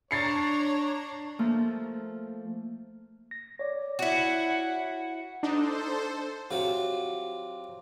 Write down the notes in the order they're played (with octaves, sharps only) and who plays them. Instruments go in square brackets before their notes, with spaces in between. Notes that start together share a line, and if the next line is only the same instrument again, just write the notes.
[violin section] D4 A#5 [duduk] C#5 [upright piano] A6 C7 C#7
[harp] F3 A3 A#3
[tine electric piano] A#6
C#5 D5
[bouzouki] E4 F#4 [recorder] F#5
[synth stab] D4 D#4 [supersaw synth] A4 C5
[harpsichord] C3 F#3 F4